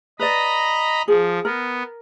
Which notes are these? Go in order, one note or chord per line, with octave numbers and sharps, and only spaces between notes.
B4 D5 D#5 A#5 B5
F3 G#4
B3 A#4